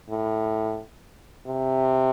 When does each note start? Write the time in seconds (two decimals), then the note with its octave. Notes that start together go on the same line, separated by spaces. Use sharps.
0.09 A2
1.47 C3